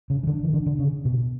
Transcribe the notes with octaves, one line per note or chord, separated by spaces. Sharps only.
C#3
E3
D3
E3
D3
D3
C#3
B2